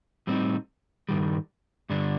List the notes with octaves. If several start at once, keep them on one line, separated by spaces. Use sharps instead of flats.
A2 G3 C4 D#4
G2 D#3 G3
G2 D3 G3 D4